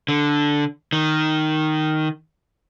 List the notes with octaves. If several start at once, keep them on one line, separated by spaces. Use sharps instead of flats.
D3
D#3